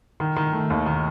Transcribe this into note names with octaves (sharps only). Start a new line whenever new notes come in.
D#3
D#3
A3
D#2
D#3